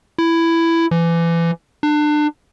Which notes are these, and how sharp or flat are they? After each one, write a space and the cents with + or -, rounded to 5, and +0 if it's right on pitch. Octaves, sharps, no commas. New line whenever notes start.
E4 +10
E3 +30
D4 +30